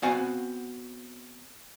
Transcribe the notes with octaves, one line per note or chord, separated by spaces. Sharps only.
B3 C4 F#4 F5 G#5